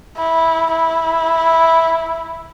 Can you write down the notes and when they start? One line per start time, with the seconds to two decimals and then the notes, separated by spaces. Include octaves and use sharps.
0.17 E4
0.71 E4